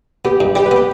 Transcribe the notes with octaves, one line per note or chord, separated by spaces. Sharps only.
B3 G4
G2
G3 G4
B4
B3 G4